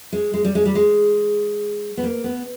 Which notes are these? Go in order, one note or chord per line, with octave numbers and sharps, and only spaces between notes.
G#3
G#3
G3
G#3
G3
G#3
B3
A#3
B3